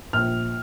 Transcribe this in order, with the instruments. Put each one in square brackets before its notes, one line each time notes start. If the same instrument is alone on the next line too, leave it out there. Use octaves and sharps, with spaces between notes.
[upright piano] A#1 F6